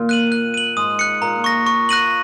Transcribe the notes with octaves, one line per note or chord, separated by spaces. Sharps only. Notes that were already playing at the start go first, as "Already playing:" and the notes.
Already playing: A#2 D#3 A#3
F#6 D#7 F#7
F#6
D#7 F#7
G#2 G#3 D#6
F#6 C#7
A#2 A#3 A#5
C#6 A#6
C#6
F#6 A#6 D#7 F#7